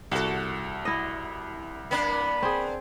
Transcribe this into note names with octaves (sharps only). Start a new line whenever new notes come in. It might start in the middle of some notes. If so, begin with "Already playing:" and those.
C2 F#4 A4
E4 D#5
A#3 B3 D4 B5
C4 G#4